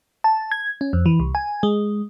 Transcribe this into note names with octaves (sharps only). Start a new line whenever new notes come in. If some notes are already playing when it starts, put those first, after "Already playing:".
A5
G#6
C#4
F2
E3
C2
G#5
G#3